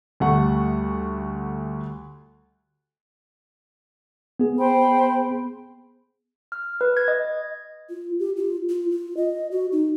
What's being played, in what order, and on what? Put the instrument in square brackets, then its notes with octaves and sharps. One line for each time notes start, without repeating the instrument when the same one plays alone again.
[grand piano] D2 G3 A3 F#5 C#6
[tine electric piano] B3 G#4
[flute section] C5 G5 B5
[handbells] F6
B4
G#6
D#5
[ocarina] F4
G4
F4
F4
F4
D#5
F#4
D#4